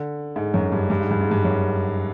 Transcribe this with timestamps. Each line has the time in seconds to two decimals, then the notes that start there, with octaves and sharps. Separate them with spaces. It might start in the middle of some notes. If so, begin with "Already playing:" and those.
Already playing: D3
0.36 G#2
0.54 F#2
0.72 G2
0.90 G2
1.01 G#2
1.11 G2
1.21 G#2
1.31 G2
1.45 F#2